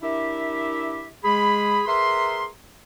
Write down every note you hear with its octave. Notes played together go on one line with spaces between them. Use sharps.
D4 E4 G4 A#4 E5
G#3 G#4 B5
G#4 A#4 B4 E5 A#5 C6